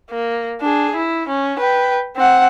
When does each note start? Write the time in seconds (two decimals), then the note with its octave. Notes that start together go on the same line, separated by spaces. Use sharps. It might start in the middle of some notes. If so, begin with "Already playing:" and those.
0.10 A#3
0.62 D4 G#4
0.96 E4
1.28 C#4
1.59 B4 G5
2.16 C4 F#5